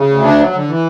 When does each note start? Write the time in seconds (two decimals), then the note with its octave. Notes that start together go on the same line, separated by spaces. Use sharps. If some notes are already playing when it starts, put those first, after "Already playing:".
Already playing: C#3
0.09 D2
0.24 D4
0.39 F#3
0.54 D3
0.68 E3